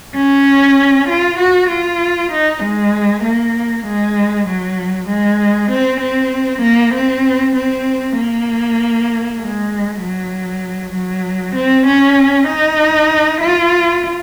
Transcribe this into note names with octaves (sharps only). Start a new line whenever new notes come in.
C#4
F4
F#4
F4
D#4
G#3
A#3
G#3
F#3
G#3
C4
C4
A#3
C4
C4
A#3
G#3
F#3
F#3
C4
C#4
D#4
F4